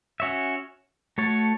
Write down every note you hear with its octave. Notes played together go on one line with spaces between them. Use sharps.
C#4 F#4 C#5 E5
A3 F#4 A4 C#5